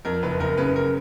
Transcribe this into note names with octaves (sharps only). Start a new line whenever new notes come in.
F2 A#4
F#1 B4
F#1 A#4
C#3 B4
A#4